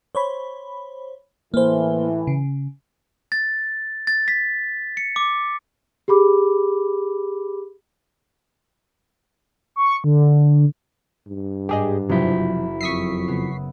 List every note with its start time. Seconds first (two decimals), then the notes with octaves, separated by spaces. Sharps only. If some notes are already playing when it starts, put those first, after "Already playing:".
0.15 C5 C#5 B5
1.54 A2 E3 A#3 C5
2.27 C#3
3.32 A6
4.07 A6
4.28 B6
4.97 C#7
5.16 D6
6.08 G4 G#4 B5 D6
9.76 C#6
10.04 D3
11.28 G2
11.69 G#2 D4 G4 G#4 D#5
12.10 F#1 C3 F3 F#3 E4 G6
12.81 F2 E5 C#6 D#6 B6 C7
13.28 C#3 B3